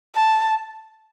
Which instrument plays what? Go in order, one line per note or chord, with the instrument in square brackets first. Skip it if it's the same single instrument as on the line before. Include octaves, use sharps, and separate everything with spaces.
[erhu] A5